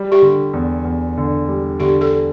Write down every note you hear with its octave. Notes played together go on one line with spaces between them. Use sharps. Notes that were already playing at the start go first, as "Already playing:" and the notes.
Already playing: G3
G4
D3
E2
E2
D3
G3
D3 G4
A4